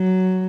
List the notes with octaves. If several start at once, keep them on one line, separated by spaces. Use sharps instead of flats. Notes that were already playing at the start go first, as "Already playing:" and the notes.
Already playing: F#3